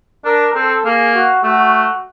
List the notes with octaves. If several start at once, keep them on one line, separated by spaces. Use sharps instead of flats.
D4 A#4
C4 A4
A#3 G#4
F#4
A3 F#4